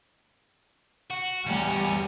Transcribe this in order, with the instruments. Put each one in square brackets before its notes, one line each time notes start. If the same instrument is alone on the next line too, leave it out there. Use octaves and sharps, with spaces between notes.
[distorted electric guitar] F#4
[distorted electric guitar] E2 C#4 [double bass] G3